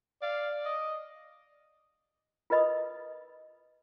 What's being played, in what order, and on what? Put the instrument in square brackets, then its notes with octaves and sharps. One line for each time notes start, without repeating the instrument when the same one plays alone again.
[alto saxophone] D5 [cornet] F5
[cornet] D#5
[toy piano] F4 A#4 B4 D#5 B5 D#6